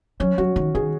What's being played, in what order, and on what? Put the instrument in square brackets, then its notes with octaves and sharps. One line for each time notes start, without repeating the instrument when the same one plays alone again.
[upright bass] F#3 [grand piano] C#4
[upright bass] F#3 [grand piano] F#4
[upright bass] D#3
[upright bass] D#3 [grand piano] G#4